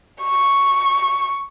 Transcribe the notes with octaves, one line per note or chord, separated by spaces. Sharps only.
C#6